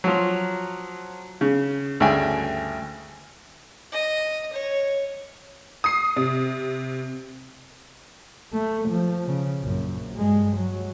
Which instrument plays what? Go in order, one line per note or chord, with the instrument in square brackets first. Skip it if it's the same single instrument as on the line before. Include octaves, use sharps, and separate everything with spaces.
[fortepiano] F3 F#3
C#3
D2 G2 C#3 E5 G5 G#5
[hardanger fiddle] D#5
C#5
[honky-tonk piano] D#6 C7
C3
[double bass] A3
F3
C#3
A#1 F#2
G2 G#3
F#3